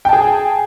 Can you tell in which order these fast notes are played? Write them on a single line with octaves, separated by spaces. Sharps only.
G5 A5 G#4